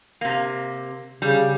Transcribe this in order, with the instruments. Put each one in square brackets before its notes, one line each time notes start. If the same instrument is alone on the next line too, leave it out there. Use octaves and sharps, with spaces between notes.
[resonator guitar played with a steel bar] C3 A#3
[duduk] C#3 [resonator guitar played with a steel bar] G3